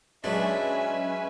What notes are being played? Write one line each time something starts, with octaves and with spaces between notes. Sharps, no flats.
F#3 G#3 C#4 D4 B4 E5 G#5